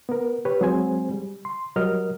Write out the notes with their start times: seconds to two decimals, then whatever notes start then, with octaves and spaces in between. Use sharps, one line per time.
0.09 B3 A#4
0.45 G4 B4 C#5
0.61 F#3 G#3 C4 G#4 C5 G#5
1.11 G3
1.45 C6
1.76 F#3 G3 A#4 D#5 F6